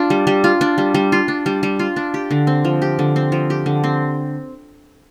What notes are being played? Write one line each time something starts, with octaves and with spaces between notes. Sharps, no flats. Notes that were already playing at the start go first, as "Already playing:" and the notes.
Already playing: D4 F4
G3
G3
F4
D4
G3
G3
F4
D4
G3
G3
F4
D4
G4
D3
C4
F3
G4
D3
C4
F3
G4
D3
C4